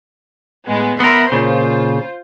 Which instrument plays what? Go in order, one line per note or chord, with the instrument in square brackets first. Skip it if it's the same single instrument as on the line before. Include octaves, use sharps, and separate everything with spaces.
[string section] A2 G#3 B3
[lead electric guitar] B3 A#4 [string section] E5 B5 C6
[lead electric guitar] A#2 C#3 [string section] F4 C5